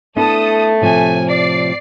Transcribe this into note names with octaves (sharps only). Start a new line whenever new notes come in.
A3 B3 D4 E4 A4 D#6
A2 C3 F3 G#5
D5 C7